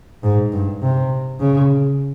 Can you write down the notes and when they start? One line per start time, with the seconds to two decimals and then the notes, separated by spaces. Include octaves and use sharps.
0.23 G#2
0.52 G2
0.82 C3
1.39 C#3